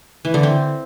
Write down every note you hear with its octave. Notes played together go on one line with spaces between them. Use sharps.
E3
D3
C4